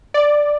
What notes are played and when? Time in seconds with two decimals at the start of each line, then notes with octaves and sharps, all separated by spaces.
0.14 D5